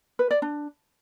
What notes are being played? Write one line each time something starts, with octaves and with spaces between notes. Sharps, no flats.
B4
D5
D4